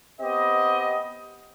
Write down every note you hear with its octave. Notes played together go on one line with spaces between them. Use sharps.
B3 C4 G4 D#5